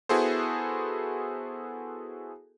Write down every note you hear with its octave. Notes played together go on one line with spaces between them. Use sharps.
B3 E4 F#4 G#4 A4 C5